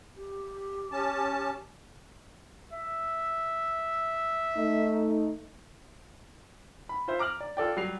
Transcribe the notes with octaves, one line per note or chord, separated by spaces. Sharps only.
G4
C#4 A5
E5
A3 D#4
B5
F4 C5 E5
A#5 D6 F6 F#7
D5
F4 A4 D5 G5
F#3 G3 C7 F7